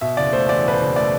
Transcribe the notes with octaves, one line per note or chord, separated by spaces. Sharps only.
B2 E5
F#1 D5
A3 C5
E2 D5
B2 B4
C5
F#1
A3 D5